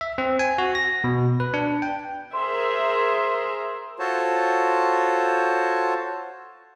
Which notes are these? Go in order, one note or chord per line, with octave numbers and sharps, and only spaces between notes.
E5
C4
G#5
F#4
A#6
B2
B4
D4
G5
G#4 A#4 C5 E5
F4 F#4 A4 C5 C#5 A5